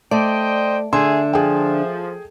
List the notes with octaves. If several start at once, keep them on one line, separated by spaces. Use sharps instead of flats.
A3 C5 D5 D#5 G5
D3 G#4 E5 G#5 C6
F3 G#4 G5